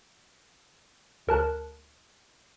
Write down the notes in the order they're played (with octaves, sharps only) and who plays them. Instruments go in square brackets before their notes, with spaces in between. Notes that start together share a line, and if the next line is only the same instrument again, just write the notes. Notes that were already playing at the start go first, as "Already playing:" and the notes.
[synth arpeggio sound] D2 A#4 A5 F#6